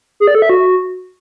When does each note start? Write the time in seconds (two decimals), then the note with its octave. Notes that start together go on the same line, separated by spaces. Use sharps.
0.20 G#4
0.27 D5
0.35 A4
0.42 E5
0.50 F#4